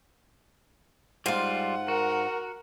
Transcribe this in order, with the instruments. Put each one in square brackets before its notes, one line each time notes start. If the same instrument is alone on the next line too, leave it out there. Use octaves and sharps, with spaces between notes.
[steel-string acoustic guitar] G#2 F5 [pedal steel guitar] G3 F4 [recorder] F#5
[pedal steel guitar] F#4 [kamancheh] A#4